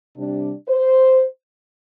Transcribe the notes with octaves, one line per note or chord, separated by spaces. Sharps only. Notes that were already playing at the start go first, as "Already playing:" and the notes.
C3 G3 D4
C5